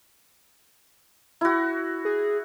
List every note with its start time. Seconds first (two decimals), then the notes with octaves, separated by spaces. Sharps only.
1.41 E4 F#4
2.05 G#4